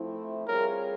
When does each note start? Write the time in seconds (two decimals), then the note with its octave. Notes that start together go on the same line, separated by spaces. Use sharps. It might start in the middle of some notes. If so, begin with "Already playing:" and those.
Already playing: F3 A3 C4 E4
0.47 G3 C4 F4 G#4 A#4 C#5